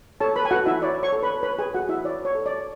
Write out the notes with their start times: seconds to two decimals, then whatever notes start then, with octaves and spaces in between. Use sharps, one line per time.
0.20 A4 C#5 A5
0.36 B4 B5
0.45 G#5
0.51 F#4 A4 F#5
0.66 E4 E5
0.82 C#5 D5
1.03 C#5 C#6
1.13 A4
1.23 B4 B5
1.43 B4 C#5 B5
1.59 G#4 G#5
1.74 F#4 A4 F#5
1.89 E4 E5
2.04 C#5 D5
2.25 C#5
2.35 A4
2.46 D5